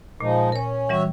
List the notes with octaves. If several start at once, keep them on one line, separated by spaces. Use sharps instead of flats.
A#2 F3 G#3 D#4
C#4 A#4 C#5
E3 G3 C#4 F#4 C#5 E5